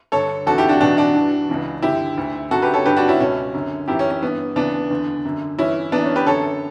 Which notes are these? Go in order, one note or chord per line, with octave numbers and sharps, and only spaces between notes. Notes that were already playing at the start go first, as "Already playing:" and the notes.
G2 D3 A4 C#5
E2 D3 F#4 A4
E4 G4
D4 F#4
E2 B2 D4 F#4
D4 F#4
G2 E3
C#2 C#3 E3
G2 D3 E4 G4
D2 D3
F#2 D3 F#4 A4
G4 B4
A4 C#5
G2 D3 G4 B4
D4 F#4
C#4 E4
C#2 B2 C#4
F#2 D3
F#2 E3 E4 G4
C#4
C#4
G2 E3 B3
D2 C#3 E3 B3 D4
E2 D3
F#2 D3
G2 E3 C#4 E4
F#2 E3 B3 D4
C#4
G4 B4
F#2 D3 A4 C#5